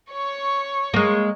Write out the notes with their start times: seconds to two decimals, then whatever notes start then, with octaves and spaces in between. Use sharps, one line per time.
0.12 C#5 C#6
0.94 G#3 A#3